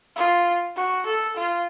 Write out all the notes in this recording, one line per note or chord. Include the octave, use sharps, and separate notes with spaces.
F4
F#4
A4
F4